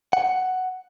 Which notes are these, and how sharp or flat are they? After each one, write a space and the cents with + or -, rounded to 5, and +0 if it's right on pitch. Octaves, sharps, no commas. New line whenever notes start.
F#5 +5